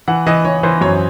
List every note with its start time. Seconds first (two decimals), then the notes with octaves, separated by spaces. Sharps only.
0.08 E3 F#5
0.26 E3 D#5
0.45 E3 C#5
0.63 E3 C5
0.81 F#2 C#5